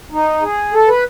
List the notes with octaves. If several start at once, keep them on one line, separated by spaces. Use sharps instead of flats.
D#4
G#4
A4
B4